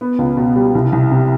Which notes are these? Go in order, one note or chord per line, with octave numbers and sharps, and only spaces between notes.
B3
C#2
B2
G3
C2
C2
C3